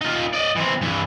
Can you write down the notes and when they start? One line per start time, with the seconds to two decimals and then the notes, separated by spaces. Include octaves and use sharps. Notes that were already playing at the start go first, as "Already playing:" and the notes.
0.01 D#4 F4
0.34 D5 D#5
0.57 E3 C4
0.81 G2 E3